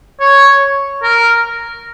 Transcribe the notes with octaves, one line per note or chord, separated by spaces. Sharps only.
C#5
A#4